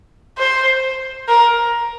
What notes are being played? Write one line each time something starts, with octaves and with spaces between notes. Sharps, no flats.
C5
A#4